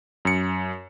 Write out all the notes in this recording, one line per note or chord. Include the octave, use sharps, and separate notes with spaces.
F#2 C#7